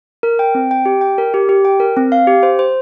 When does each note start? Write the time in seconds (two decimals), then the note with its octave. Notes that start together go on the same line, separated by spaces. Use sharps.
0.23 A#4
0.39 G5
0.55 C4
0.71 G5
0.86 G4
1.01 G5
1.18 A#4
1.34 G4
1.49 G4
1.65 G5
1.80 A#4
1.97 C4
2.12 F5
2.27 G4
2.43 C5
2.59 C5